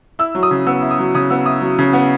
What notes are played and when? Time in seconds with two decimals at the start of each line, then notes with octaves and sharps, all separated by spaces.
0.19 E4 E6
0.35 F#3
0.43 D#6
0.51 C#3
0.67 B3 E6
0.83 E4
0.91 D#6
0.99 F#3
1.15 C#3 D#6
1.30 B3 E6
1.46 E4 D#6
1.62 F#3
1.79 C#3
1.93 B3